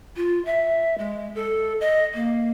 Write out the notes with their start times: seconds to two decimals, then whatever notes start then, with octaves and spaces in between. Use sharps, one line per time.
0.16 F4
0.45 E5
0.98 G#3
1.35 A4
1.81 D#5
2.14 A#3